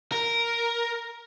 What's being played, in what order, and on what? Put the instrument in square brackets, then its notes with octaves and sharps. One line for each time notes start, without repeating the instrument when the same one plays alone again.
[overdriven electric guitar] A#4